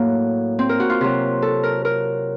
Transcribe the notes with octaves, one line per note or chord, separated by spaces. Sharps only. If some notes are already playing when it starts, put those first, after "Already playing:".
Already playing: A2 F#3 A#3
C4
A#4
F#4
F4
C3 F#3
A4
A#4
A#4